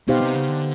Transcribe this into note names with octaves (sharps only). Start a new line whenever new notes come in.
B2 B3 D#4 G4 C5 F5
C3
C#3
D3